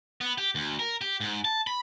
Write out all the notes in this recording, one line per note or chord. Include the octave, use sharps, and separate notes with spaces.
B3
G4
D2
A#4
G4
G#2
A5
B5